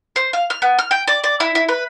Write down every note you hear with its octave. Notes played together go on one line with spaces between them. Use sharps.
C5
F5
F6
B3
F6
G5
D5
D5
E4
E4
B4